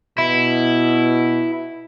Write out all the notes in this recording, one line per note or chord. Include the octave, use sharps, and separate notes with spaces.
B2 E4